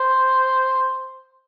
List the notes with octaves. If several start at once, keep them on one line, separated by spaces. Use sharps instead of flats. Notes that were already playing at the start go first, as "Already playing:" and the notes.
Already playing: C5